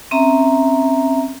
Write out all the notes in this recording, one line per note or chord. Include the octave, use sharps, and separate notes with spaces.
C4 C#4 E5 A#5